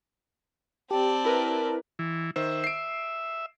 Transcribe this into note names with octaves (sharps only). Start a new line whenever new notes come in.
C4 G4 D5 A5
E4 A#4 B4
E3
D#3 C5 E5
C7 D7